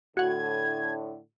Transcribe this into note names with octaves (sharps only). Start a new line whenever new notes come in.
A2 D3 F#4 F#5 G#6